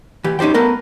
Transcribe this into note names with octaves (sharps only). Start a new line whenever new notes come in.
E3 G4
C#4 D#4 G4 C5 G5
A3 B3 A#4 B4